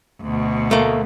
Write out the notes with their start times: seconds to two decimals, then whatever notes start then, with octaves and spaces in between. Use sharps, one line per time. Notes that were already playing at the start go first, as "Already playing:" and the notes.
0.22 D2 B2
0.71 A3 A#3